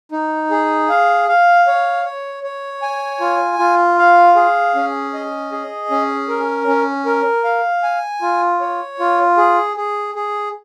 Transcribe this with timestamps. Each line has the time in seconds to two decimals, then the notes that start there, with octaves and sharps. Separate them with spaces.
0.12 D#4
0.51 G#4
0.89 F5
1.29 F5
1.67 C#5
2.05 C#5
2.43 C#5
2.82 G#5
3.20 F4
3.59 F4
3.98 F5
4.36 G#4
4.75 C#4
5.13 D#5
5.52 G#4
5.91 C#4
6.29 A#4
6.67 C#4
7.06 A#4
7.44 F5
7.83 G#5
8.22 F4
8.61 C#5
8.99 F4
9.37 G#4
9.77 G#4
10.15 G#4